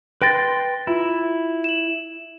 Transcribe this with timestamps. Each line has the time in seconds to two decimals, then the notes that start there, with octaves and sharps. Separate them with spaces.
0.22 B4 G5 C6 A6 A#6 D7
0.87 E4 F4
1.64 E7 F#7